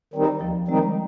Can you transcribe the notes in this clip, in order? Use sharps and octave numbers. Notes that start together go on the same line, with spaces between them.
D#3 G3 C4 D#4
D#2 F3
D#3 G3 G#3 C4 D#4
G3